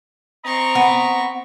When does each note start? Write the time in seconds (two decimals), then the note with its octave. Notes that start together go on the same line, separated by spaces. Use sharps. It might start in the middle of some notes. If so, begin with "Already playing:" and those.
0.45 C4 D#5 A#5 C#6
0.75 B3